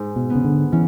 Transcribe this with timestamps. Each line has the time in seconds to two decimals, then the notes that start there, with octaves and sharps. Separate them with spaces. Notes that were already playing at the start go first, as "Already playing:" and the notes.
Already playing: G#2
0.16 B2
0.30 B3
0.35 C#3
0.45 D3
0.72 E3 C#4